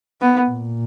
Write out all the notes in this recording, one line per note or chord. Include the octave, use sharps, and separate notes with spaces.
B3
A#2